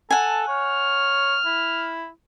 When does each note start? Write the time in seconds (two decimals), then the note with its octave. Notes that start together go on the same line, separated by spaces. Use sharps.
0.11 A4 F#5 G#5 A5
0.48 C#5 F6
1.46 E4